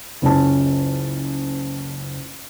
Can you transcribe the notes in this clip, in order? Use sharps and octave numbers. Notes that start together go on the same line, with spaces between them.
F#1 C#2 C#4 A5